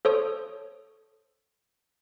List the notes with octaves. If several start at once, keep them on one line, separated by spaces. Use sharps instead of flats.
A4 C5 C#5 D#6